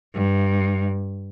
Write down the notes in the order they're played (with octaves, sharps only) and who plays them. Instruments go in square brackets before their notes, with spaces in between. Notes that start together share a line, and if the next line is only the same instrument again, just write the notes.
[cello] G2